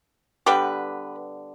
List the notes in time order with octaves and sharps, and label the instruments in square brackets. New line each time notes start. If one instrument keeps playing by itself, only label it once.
[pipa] D3 G3 B3 G4 B4